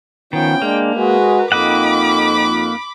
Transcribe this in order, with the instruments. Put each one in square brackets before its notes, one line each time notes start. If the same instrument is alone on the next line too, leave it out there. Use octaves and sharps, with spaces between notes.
[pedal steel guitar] D#3 [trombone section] F3 B3 C#4 [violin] G5
[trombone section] G#3 D4 [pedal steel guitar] A#3
[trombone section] G#3 F#4 [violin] A#4 B4
[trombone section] F2 D#4 [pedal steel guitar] A#3 D#5 F#5 [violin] B5 D6